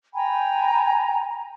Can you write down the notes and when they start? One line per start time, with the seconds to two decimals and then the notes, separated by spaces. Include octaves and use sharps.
0.13 G5 G#5 A#5 B5